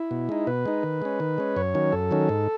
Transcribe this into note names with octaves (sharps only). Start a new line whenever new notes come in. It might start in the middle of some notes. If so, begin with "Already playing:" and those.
Already playing: E4
B2
G#3 D#4
B2 B4
G#3 D#4
D#3
G#3 C#4
D#3
G#3 C#4
F#2 C#5
D#3 F#3 C#4
F#2 A4
D#3 F#3 C#4
G#2